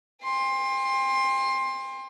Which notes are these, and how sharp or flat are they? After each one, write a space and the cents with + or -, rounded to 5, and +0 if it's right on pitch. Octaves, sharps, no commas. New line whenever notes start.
G5 +45 C6 +15